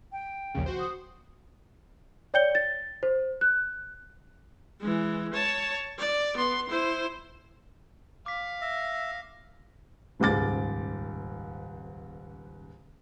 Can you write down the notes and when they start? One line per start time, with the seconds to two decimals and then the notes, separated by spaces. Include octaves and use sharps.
0.12 G5
0.55 A#1 D#2 C#3
0.66 F#4 C5
0.80 D#6
2.34 C#5 D5 G5 G6 C#7 G7
2.55 A6
3.03 C5
3.41 F#6
4.80 E3 G#3
5.33 C#5 A5
5.99 D5
6.37 B3 C6
6.69 E4 C5
8.26 F5 D6 B6
8.61 E5 A#6
10.20 D#1 C#2 G#2 D6 A6